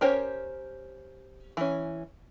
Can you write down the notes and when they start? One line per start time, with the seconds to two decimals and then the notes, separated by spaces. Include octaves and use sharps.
0.01 C#4 G4 A#4 C5 C#5
1.57 E3 C#4